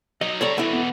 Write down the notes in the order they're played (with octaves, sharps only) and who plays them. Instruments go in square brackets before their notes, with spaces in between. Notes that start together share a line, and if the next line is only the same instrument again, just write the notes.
[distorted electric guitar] F#3 D#4 [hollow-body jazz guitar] D#5
[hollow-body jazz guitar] G3 A4 C#5 [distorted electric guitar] C4 A#5
[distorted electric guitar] B2 E3 [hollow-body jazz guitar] A3 E4
[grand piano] B3